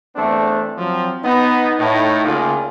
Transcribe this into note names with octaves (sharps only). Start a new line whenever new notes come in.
E2 A3 C4 D4
F3 F#3 C4
B3 D#4
A2 D#4
D2 C#3 A#3 F4